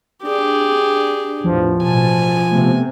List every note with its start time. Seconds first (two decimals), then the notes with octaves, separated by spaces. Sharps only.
0.23 D4 G4 G#4
1.44 E2 A2 F3
1.83 A1 B2 G#5 A5
2.51 C3 A3 B3